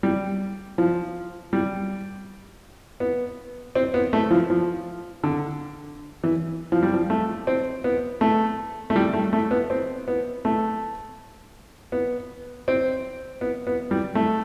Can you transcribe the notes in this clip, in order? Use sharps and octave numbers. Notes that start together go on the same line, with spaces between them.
G3
F3
G3
B3
C4
B3
A3
F3
F3
D3
E3
F3
G3
F3
A3
C4
B3
A3
A3
G3
A3
A3
B3
C4
B3
A3
B3
C4
B3
B3
G3
A3